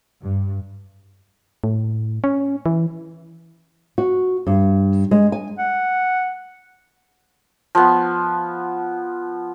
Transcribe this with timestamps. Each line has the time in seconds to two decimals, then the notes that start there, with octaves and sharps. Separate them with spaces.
0.21 G2
1.64 A2
2.24 C#4
2.66 E3
3.98 F#4
4.47 G2
5.11 G#3
5.32 G#5
5.58 F#5
7.75 F3 B3